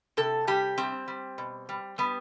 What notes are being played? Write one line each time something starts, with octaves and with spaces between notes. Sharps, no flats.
C3 A4
G3 G4
G3 C4
G3
B2
G3
G3 B3